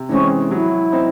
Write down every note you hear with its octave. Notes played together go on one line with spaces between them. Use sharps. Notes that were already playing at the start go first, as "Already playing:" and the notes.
Already playing: C3
E3 G#3 C4 C#4
F#3 E4
C4 D#4